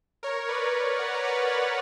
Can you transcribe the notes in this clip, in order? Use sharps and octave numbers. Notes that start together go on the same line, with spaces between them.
A#4 C#5
B4 D5
D5 F#5
B4 D5
A#4 C#5